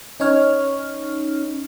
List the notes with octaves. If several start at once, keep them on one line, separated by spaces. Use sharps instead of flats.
C#4 D#4 C#5 F6